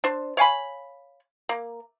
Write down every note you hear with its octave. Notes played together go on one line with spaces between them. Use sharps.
D4 C5
C#5 F5 G#5 B5
A#3